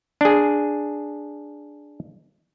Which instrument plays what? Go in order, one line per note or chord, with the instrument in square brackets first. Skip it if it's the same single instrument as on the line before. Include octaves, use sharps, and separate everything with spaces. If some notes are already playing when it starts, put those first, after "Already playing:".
[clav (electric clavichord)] D4 G#4